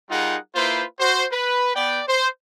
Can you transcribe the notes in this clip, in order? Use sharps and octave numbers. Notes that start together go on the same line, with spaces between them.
G3 D#4 F4 G#4 A#4 F#5
A#3 E4 F4 B4 C5
F#4 C5
B4
B3 D5 G5
C5